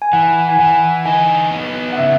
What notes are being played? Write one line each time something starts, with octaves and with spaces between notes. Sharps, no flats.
G#5
E3 F#5
G#5
E3 F#5
D#4 G#5
B3
F#5
C#3 E5